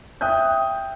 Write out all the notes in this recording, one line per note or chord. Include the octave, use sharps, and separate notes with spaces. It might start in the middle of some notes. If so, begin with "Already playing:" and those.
E5 G5 D#6 F#6 G6